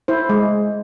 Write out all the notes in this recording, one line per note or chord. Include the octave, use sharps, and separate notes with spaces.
E4 C5
G#3